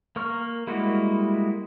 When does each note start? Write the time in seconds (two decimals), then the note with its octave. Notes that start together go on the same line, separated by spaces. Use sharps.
0.16 A#3 A#4 C#6 F6
0.67 G3 G#3 A#3 E4 F#4